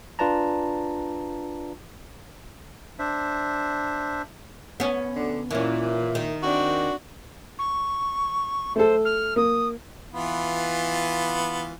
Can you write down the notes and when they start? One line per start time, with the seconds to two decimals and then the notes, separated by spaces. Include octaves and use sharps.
0.19 D4 F4 B4 D5 A5 A#5
2.99 D4 C5 E5
4.80 B3 C#4
5.16 D2 D3
5.51 A#2 E3 C#4
6.15 D#3
6.43 C4 D4 F#4
7.58 C#6
8.76 A3 A4 C5
9.05 F6
9.36 A#3 D#6
10.13 E3 B3 F4